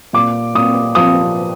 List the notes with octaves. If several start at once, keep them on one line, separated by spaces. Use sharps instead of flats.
A#2 D6
A#2 D#6
F3 D#6